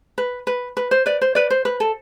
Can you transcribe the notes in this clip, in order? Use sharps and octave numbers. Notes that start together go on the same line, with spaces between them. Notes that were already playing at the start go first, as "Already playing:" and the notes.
B4
B4
B4
C5
B4 D5
C5
B4 D5
C5
B4
A4